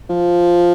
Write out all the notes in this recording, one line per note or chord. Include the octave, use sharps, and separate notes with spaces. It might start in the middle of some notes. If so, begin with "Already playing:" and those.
F3